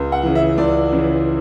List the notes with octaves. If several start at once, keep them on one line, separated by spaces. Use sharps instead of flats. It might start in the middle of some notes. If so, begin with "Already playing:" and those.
Already playing: C#2
F#5
C#3 E3
E5
C#2 D5
C#3 E3